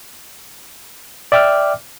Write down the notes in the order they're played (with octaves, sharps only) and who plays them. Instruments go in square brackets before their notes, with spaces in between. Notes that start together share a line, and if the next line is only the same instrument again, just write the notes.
[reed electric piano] D5 E5 G5 D6 F6